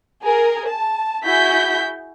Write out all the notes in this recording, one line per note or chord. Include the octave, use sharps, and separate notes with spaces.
G#4 A#4
A5
E4 F#4 G#4 G6 B6